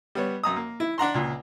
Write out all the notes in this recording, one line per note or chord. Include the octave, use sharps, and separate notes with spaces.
G3 B3 C#5
F#2 A#5 D#6
A#3
E4
D4 F#5 A#5 C6
C#2 A#2